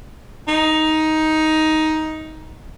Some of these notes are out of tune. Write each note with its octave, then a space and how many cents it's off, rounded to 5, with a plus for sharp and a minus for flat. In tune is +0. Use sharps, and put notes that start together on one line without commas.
D#4 +10